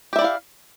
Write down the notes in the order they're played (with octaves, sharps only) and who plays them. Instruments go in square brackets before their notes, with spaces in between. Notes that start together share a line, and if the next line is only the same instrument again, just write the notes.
[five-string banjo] G4
E5
D5
E4
F5